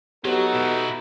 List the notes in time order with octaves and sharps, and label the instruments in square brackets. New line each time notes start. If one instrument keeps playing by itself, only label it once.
[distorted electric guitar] F#3 [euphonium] B3 [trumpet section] D#4 F#4 A4 [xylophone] G4
[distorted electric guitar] B2 E4